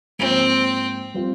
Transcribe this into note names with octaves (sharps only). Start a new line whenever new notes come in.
G#2 F3 A#3 C4
G3 C4 F4